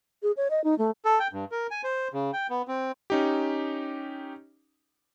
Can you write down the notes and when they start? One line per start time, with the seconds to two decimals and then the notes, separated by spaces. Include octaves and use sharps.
0.23 G#4
0.37 C#5
0.50 D#5
0.64 D#4
0.78 A3
1.05 A4
1.20 G5
1.33 G2
1.52 A#4
1.71 G#5
1.84 C5
2.13 C#3
2.33 G5
2.50 B3
2.68 C4
3.10 C#4 D#4 G4